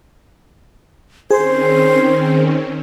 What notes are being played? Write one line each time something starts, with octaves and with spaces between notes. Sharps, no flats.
D#3 C4 C#4 G#4 C5